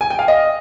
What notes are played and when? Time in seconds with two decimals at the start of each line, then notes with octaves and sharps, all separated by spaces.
0.01 G#5
0.10 G5
0.19 F5
0.28 D#5